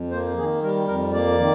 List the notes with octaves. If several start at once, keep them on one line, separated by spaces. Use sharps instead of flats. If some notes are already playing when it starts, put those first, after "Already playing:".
Already playing: F2
A#3 C5
D#3 G#4
G3 A#4
F2 A#4
A#3 D5
D#3